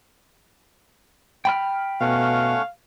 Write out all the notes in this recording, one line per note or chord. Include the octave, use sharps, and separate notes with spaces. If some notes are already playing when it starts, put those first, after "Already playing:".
G5 B5 F6
B2 A3 C#4 F5 F#5